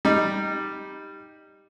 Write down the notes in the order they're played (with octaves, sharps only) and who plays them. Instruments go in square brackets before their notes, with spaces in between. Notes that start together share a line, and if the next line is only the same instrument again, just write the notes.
[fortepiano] G3 D#4